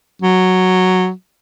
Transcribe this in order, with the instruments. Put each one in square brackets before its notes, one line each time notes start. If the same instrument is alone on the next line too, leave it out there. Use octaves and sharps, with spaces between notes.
[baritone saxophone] F#3